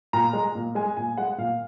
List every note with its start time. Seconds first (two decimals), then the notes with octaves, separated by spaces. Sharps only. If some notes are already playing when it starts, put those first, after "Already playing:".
0.13 A#2 A#5
0.33 G#3
0.55 A#2
0.75 G#3 G#5
0.97 A#2 G#5
1.17 G#3 F#5
1.38 A#2 F5